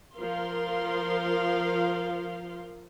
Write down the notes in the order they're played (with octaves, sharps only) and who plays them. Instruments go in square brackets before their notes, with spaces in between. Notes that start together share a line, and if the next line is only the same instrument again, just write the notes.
[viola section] F3 A#4 F5 C6